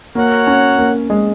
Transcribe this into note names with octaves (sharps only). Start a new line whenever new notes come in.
A#3 F#4 A#4 C#5 F#5
C#4
A#3
G#3